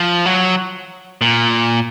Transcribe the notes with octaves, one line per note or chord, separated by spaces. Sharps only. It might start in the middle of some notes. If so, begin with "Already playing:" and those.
Already playing: F3
F#3
A#2